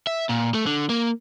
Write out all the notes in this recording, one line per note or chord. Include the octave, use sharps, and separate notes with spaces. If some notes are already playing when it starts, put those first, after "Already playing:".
E5
A#2
A3
D3
A#3